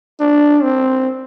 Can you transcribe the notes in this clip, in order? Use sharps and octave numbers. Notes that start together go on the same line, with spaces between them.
D4
C4